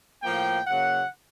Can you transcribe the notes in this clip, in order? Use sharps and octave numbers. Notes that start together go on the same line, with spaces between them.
A2 F3 A#3 G5
C#3 F#3 A#3 F#5